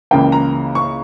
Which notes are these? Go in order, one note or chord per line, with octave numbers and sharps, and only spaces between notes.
C#2 C#3 E3 A#3 G5
A#5
C#6